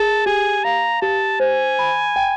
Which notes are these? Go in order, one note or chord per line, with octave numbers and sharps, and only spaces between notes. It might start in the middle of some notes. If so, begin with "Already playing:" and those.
Already playing: G#4 A5
G4 G#5
F5 A#5
G4 A5
C5 G#5
B5
G5